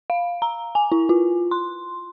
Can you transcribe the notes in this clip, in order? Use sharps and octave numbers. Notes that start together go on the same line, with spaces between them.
F5
A#5
G#5
E4
F4
C6